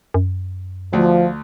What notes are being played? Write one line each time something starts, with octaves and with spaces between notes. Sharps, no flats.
F#2
D2 F3